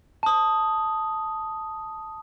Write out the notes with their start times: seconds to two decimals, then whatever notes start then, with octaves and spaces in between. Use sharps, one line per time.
0.23 A5 D#6